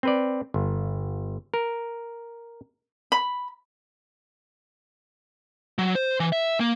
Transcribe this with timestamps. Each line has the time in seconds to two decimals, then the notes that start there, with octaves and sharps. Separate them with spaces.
0.03 C4 B4 D5
0.54 G1
1.54 A#4
3.12 B5
5.78 F#3
5.95 C5
6.20 E3
6.32 E5
6.60 A#3